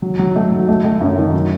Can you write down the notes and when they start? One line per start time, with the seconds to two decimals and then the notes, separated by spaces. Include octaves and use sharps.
0.02 F#3
0.19 F#3
0.36 A3
0.52 F#3
0.69 A3
0.84 A3
1.00 F#2
1.17 D#3
1.34 F#3